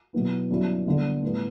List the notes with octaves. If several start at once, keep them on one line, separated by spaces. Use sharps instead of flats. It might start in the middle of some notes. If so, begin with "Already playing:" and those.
B2 F#3 B3 E4
G1 G2 F#3 C#4 E4
G1 G2 D3 G3
A2 G3 B3